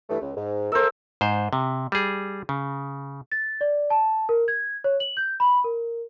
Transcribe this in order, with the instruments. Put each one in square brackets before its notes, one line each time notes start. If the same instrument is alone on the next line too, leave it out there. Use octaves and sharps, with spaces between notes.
[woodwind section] G2 E3 A3
C#2
G#2
[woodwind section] A4 A#4 [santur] C5 E5
[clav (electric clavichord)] G#2 C5
C3
G3 G#4
C#3
[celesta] A6
D5
A5
A#4
G#6
C#5
F#7
G6
B5
A#4